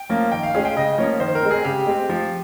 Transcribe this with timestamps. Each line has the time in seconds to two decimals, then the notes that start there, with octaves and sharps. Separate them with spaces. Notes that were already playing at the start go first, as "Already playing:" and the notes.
Already playing: G5
0.09 F3 A#3 C#4 F4
0.32 D#3 G5
0.43 F5
0.54 G#3 C#4 F4 G#4
0.65 G5
0.76 C#3 D#5
0.98 F3 A#3 C#4 C#5
1.20 D#3 C5
1.35 A#4
1.43 G#3 C4
1.51 G#4
1.65 C#3 G4
1.86 G#3 C4
2.09 F3